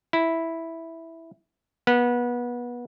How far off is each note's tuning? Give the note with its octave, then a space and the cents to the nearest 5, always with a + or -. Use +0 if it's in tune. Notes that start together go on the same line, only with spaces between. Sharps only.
E4 -5
B3 -25